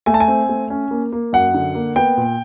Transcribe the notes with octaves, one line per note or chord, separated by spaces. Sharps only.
A3 G#5
A5
G#5
C4
A3
C#4
A#3
A#3
F#2 F#5
D3
A#3
B3 G5
A#2